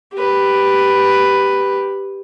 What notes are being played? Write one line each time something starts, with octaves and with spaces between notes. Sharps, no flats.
G4 B4